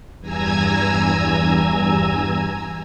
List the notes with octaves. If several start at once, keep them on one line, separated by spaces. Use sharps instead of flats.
E2 G2 G#5 A#5 E6 G#6